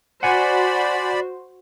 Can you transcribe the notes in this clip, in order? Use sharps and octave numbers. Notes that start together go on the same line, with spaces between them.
F#4 C5 D5 F#5 G#5 B5